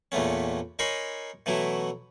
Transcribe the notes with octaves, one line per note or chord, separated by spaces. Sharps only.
E2 A#2 A3 B3 C#4
D#4 A#4 C#5 G#5 B5 C6
B2 E3 F#3 A3 E4